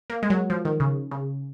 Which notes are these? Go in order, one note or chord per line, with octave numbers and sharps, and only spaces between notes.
A#3
G#3
F#3
F3
D#3
C#3
C#3